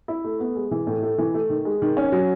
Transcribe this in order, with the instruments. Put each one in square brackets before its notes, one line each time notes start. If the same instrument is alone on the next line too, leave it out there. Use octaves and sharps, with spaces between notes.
[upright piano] E4
A3
B3
G#3
E3
A2
A3
E3
A3
D#3
G#3
D#3
C#4
F#3